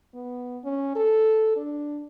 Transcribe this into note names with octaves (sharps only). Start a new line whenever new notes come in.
B3
C#4
A4
D4